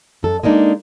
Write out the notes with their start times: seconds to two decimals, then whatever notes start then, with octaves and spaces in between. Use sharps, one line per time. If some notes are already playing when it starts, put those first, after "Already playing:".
0.23 F#2 A4
0.43 G#3 A#3 D4 D#4